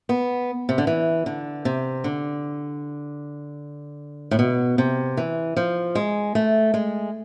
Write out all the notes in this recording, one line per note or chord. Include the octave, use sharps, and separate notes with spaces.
B3
C3
D3
E3
D3
C3
D3
A2
B2
C3
E3
F3
G#3
A3
G#3